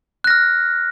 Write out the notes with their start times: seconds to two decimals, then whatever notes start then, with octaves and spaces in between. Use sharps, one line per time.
0.24 F#6
0.27 A#6
0.30 F6